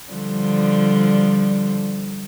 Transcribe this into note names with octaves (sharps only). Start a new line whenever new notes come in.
D3 F3 G3